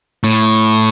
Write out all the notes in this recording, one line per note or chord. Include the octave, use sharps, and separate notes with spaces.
A2